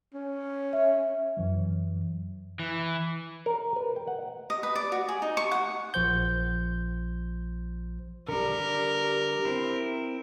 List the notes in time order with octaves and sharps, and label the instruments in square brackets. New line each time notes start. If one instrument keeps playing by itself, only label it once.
[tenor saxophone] C#4
[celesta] E5
[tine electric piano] F#2 E3 F#3
[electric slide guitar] E3
[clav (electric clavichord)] A#4
B4
G5
F#5
[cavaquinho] D#5
B4
D5
F#4
G#4
D#4
C#6
F#5
[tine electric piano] A#1 F3 C5 G6
[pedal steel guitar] D3 G3 [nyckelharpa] A#4
[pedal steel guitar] C4 E4